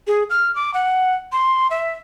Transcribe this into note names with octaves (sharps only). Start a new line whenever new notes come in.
G#4
F6
D6
F#5
C6
E5